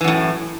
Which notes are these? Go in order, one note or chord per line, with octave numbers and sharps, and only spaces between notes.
F#2 A2 E3